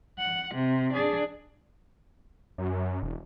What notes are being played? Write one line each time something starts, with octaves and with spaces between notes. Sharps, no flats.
F#5
C3
D4 G#4
F#2
E1